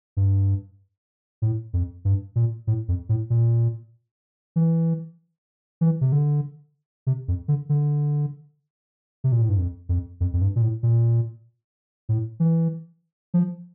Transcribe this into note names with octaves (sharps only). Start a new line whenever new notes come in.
G2
A2
F2
G2
A#2
A2
F2
A2
A#2
E3
E3
C3
D3
C3
F2
D3
D3
C3
A#2
A2
G2
F2
F2
F2
F2
G2
A#2
A2
A#2
A2
E3
F3